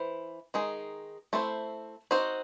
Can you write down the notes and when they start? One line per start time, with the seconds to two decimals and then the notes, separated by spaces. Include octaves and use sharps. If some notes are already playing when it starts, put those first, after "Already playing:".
Already playing: E3 E4 C5
0.54 D#3 G#3 D#4 G#4
1.33 A3 C4 E4 C5
2.11 C4 D#4 F#4 C5